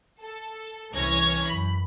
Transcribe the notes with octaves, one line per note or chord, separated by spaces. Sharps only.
A4
C2 E3 C#4 C#5 G#6 A#6
F#2 B5